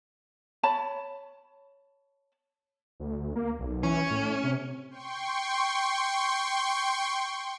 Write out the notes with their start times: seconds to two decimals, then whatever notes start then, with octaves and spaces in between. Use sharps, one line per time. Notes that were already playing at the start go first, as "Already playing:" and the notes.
0.63 C#5 A5 B5
3.00 D2
3.36 A#3
3.59 B1
3.83 E3 C#4
4.10 A2
4.43 C3
4.90 G5 C6 C#6